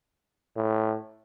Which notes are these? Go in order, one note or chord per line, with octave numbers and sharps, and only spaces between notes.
A2